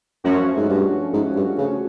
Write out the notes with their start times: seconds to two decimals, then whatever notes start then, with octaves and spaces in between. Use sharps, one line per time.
0.24 F#2 F3 A3 C#4 F#4
0.57 G#2
0.69 G2
1.13 G#2
1.36 G2
1.58 C#3